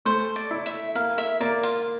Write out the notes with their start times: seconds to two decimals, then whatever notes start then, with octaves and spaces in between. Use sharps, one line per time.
0.05 A3 C5
0.36 D5
0.51 E4
0.66 E5
0.95 A#3 F5
1.18 E5
1.40 A#3 D5
1.63 F4